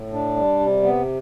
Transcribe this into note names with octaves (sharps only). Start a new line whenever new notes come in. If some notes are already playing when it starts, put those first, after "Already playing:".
Already playing: A2
D4
G3
C3
B3